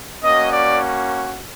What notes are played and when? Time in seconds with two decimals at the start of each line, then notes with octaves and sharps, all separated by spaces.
0.22 A#3 C#4 F#4 D#5
0.52 D5